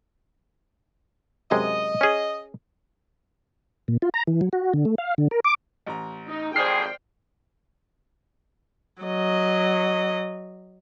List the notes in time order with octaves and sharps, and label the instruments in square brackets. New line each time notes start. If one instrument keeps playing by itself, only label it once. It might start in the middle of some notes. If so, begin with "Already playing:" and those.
[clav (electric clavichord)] F#2 C3 G#3 [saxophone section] D#5
[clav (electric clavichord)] C#4 G#4
[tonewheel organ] A#2
F4
A#5
E3
F#3
F#4
D3
A3
F5
D3
A#4
D6
[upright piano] A1 A#5
[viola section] D#4
[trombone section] G#1 F2 G#4 [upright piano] C5 D5 F6 [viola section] G5 [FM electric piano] C7
[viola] F#3 D#5